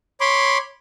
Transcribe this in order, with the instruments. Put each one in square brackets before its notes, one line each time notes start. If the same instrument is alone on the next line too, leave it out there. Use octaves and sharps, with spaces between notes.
[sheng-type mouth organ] C#5 B5 C6 D6